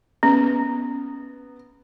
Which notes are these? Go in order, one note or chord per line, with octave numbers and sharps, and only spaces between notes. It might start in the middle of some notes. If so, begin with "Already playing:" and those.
B3 C#4